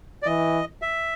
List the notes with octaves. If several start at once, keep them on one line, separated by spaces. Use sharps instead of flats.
D5
E3 D#5
E5